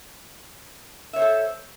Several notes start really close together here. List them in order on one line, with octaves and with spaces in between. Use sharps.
E5 C#5 C5 A4